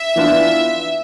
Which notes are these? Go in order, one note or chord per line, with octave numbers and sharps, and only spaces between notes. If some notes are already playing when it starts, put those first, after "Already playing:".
Already playing: E5
E3 B3 D4 F4